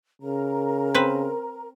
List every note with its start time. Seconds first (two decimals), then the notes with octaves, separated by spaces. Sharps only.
0.21 C#3 A#4 A#5
0.95 C4 B4